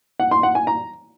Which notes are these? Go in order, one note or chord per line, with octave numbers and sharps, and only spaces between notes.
F#5
C6
F#5
G#5
A#5